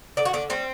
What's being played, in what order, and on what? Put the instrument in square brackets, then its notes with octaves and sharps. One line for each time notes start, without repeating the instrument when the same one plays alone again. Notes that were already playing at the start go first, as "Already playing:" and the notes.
[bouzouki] D3 D5
F#4
D3 D4
G3 C4